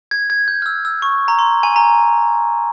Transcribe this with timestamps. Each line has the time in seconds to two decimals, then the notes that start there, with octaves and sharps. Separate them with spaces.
0.11 G#6
0.30 G#6
0.48 G6
0.62 F6
0.66 E6
0.85 E6
1.02 C#6
1.28 A#5
1.39 C6
1.63 G#5
1.76 A#5